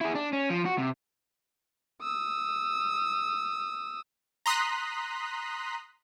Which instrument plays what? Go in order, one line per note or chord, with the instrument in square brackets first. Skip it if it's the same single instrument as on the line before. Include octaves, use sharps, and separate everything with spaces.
[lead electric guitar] E4 G#4
D4
C#4
F3
F#4
C3
[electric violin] D#6 E6
[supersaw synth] A#5 C6 D#6 F#6 B6